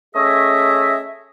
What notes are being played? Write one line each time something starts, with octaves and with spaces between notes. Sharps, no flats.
A3 C#4 G#4 C#5 D#5 E5